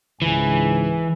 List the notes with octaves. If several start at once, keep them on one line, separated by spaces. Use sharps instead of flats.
C#2 G#2 E3 G#5